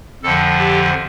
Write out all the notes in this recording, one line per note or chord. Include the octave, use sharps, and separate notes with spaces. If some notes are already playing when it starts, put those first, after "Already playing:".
F2 D3 F3 A4
G4